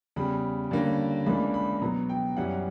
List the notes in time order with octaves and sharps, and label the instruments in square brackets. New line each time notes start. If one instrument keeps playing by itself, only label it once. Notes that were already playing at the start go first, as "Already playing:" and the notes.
[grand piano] E2 C#3 G3 B5
G2 D3 A#3 C#4
C#2 C#3 E3 A#3 D4 B5
B5
B2 F#3 B3 A#5
G5
F#2 E3 G3 C#4 F#5